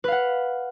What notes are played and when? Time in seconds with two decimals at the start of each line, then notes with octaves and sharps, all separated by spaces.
0.04 B4
0.08 F5
0.12 F#5